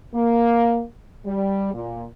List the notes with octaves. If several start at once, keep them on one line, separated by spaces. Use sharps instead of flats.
A#3
G3
A#2